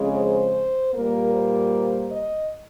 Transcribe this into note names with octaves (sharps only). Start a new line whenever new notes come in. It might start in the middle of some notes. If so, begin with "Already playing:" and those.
Already playing: F2 C#3 G#3
C5
A#2 G3 A#3 A#4
C5
D#5